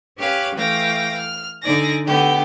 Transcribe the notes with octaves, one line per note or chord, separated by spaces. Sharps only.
C#4 G4 B4 C#5 F5
E3 A3 F5 G5 A#6
F6
D3 D#4 D5 G#5 A#6
D3 A3 B3 G4